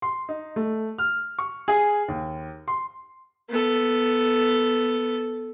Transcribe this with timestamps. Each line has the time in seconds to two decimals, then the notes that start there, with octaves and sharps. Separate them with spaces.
0.02 C6
0.29 D#4
0.56 A3
0.98 F6
1.39 C#6
1.68 G#4
2.08 D#2
2.68 C6
3.50 B3 A4